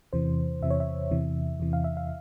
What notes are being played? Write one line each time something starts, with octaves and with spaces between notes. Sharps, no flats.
E2 C3 E3 C5
E2 C3 E3 E5
C#5
E5
E2 C3 E3
E2 C3 E3
F5
E5
F5